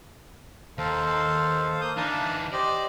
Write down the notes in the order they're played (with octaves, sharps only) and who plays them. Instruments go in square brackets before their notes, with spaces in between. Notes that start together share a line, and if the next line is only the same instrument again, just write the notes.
[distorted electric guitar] D#2 [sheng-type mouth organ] A4 C5 F5
[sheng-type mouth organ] A#3 D#6 G6
[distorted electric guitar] E3 D#4 [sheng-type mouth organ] D4 F5 A5
[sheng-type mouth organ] G4 C5 D#5 [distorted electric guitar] D5